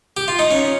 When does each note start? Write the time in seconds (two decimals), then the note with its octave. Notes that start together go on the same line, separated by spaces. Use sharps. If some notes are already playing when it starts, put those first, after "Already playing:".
0.17 G4
0.28 F4
0.39 D#4
0.51 C#4